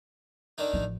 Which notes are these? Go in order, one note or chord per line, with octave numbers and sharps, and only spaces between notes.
D3 D#3 D#4
A1 F3